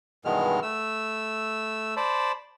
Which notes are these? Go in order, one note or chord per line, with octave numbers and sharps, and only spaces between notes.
G2 B2 D#3 E3 G#3 F6
A3 E6
C5 D5 A5 B5